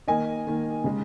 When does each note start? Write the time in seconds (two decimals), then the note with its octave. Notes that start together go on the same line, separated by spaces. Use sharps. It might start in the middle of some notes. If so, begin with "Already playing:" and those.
0.08 D#3 A#3 D#5 G#5
0.47 D#3 A#3
0.84 C#3 G#3